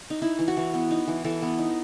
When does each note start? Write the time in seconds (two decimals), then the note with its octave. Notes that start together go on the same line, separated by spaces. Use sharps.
0.10 D#4
0.22 D#4 E4
0.39 E3
0.48 F#4
0.57 E3
0.74 B3
0.91 D#4
1.08 E3
1.25 E3 A4
1.42 B3
1.58 D#4